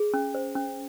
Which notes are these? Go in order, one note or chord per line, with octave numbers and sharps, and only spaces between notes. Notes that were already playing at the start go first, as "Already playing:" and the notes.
Already playing: G#4
C#4
C5
C#4